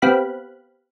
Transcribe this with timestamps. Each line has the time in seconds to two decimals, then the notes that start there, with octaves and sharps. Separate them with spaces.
0.02 B3 C4 G4 F5 B5 F#6